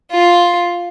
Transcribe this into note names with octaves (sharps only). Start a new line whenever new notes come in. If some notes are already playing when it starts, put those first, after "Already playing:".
F4